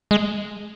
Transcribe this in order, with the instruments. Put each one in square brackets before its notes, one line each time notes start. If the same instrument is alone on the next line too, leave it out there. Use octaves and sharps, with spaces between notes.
[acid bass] G#3